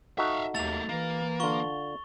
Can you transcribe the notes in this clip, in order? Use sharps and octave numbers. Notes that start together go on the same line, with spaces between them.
D#4 F#4 A4 E5 F5
D#2 A3 A#3 A6 F7
E3 A#3
D3 F4 C#6 G7